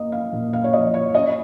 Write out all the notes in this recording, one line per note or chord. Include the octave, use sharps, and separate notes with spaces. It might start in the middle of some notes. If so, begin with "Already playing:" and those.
Already playing: A#3 D#5
F5
A#2
F5
C#5
F3 D#5
C#5
C#4 D#5